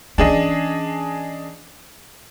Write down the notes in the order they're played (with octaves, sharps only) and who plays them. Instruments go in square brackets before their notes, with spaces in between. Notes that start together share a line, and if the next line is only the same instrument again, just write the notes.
[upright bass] E3 C#4 [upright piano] D4 G#4 D#5